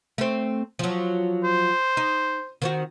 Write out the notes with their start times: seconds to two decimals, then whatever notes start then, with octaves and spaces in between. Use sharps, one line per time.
0.18 A3 C4
0.79 F3 F#3
1.44 C5
1.97 D#4
2.62 D#3 C4 F#4